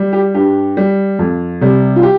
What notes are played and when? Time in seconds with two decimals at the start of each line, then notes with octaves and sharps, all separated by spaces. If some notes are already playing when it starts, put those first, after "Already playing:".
Already playing: G3
0.13 G4
0.34 G2 G4
0.77 G3
1.19 F2
1.61 C3 G3
1.96 F4
2.03 G4